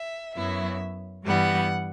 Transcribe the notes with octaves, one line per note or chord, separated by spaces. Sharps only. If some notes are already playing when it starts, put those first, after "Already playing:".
Already playing: E5
F#2 F#3 B3 E4 E5
G2 E3 G3 B3 F#5